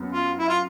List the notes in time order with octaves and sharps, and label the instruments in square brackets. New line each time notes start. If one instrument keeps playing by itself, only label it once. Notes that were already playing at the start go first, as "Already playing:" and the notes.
Already playing: [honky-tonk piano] F#2 B3
[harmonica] F4
E4
F4